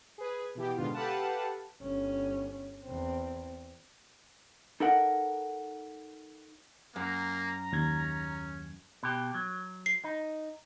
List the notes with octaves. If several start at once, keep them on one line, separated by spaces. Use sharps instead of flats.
G#4 B4
B2 E3 G4
G#2 B2 D3 B3 F4
G4 A4 B4 F5 F#5 A5
G1 C#4
E2 C4
D#4 A4 A#4 F#5
F#2 A#3 A#5
D#2 C#4 G#6
B2 G4
F#3
C7
D#4